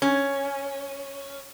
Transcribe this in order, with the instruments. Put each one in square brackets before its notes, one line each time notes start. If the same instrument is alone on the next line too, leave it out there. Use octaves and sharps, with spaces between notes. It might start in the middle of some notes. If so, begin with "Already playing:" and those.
[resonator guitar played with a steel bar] C#4